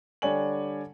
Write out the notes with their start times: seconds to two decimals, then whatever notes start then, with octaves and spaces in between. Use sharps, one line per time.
0.22 D3 G3 C#5 D5 G#5 F#7